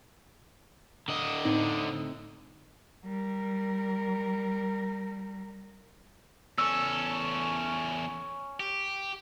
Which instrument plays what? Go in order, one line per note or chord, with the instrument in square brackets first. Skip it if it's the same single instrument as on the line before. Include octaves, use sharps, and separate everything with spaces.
[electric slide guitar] D3 D#5
[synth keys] A2 C4 D#4
[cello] G3 A#4
[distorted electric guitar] E2 A4 [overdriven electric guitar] C#4 [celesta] E6
[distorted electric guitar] G4